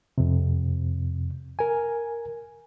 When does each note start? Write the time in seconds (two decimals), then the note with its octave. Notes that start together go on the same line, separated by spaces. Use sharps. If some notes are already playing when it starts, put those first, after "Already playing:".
0.18 F2 C3
1.59 A#4 G#5